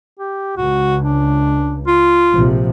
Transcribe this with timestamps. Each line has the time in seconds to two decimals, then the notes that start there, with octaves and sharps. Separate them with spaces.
0.19 G4
0.57 C#2 F#4
1.02 D4
1.87 F4
2.34 A#1 C3 F3